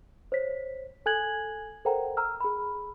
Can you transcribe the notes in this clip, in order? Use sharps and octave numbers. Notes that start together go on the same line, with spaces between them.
C5 C#5 B6
A4 G#5 F#6 G#6 F#7
A4 A#4 C5 F#5 G5 A#5
A#5 E6 F6
G#4 B5